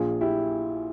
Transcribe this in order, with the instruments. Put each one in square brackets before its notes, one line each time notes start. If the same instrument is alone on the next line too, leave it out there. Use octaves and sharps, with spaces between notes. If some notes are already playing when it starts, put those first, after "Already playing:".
Already playing: [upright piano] A#1 A#2 F3 F4 G#4
E4 G4